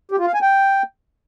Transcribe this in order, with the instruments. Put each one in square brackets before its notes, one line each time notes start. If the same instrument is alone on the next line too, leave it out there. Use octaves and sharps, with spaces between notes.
[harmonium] G4
F4
F5
G#5
G5